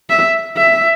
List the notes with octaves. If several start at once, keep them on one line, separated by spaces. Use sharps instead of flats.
E5
E5